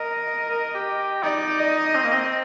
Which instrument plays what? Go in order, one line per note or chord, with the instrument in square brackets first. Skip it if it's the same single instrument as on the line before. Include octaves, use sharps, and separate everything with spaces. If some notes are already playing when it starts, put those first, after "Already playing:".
Already playing: [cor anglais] A#4 [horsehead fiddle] D#5
[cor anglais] A#4
G4
[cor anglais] D#4 [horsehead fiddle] D5
[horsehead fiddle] D#5
[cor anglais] C4
A#3
C4